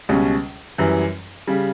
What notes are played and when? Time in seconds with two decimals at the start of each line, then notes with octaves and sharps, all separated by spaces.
0.09 C#2 B2 G3 C#4
0.78 F#2 E3 G3
1.47 C#3 G3